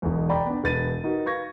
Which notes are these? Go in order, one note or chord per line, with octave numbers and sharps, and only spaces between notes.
E1 B1 E2
D5 G5 A#5 B5
B3 D4
E1 B4 A6 D#7
D#4 F#4 A#4
B4 F5 C#6 G#6 A#6